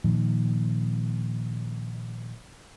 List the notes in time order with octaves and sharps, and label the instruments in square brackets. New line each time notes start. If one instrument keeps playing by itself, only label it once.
[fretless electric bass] A#2 D#3 F3